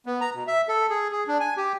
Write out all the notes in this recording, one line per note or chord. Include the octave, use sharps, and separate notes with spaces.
B3
A#5
B2
E5
A4
G#4
G#4
D4
G#5
G4